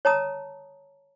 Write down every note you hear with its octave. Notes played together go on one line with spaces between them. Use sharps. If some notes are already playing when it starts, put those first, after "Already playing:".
C#5 A5 A#5 D#6